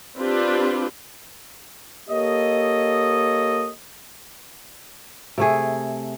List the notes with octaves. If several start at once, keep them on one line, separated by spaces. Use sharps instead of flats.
C4 D4 F4 G4 B4
A#3 G4 A4 C#5 D#5
C3 A3 G#4